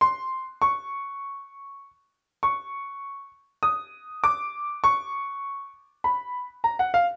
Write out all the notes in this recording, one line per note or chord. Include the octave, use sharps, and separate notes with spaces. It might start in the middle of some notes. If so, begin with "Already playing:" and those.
C6
C#6
C#6
D#6
D6
C#6
B5
A#5
F#5
F5